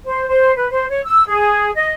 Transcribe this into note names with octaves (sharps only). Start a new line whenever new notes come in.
C5
C5
B4
C5
C#5
E6
G#4
D#5